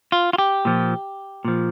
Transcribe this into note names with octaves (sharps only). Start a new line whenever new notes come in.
F4
F4
G4
A#2 F3
A#2 F3